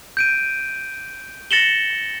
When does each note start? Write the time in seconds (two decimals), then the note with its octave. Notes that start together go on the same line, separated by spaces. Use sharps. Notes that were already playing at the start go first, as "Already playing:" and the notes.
0.17 G6 D7 D#7
1.51 A6 A#6 C#7 E7 F#7 G7